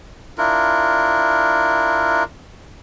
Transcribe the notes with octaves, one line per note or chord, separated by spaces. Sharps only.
D4 E4 F4 A#4